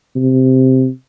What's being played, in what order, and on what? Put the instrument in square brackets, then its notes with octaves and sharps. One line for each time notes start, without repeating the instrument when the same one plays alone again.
[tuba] C3